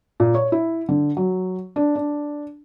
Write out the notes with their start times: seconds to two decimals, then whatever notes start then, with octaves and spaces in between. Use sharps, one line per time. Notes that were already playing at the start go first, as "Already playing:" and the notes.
0.20 A#2
0.35 C#5
0.52 E4
0.89 D3
1.17 F#3
1.76 D4
1.96 D4